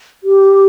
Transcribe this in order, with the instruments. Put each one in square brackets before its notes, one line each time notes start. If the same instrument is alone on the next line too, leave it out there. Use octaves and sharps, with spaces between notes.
[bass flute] G4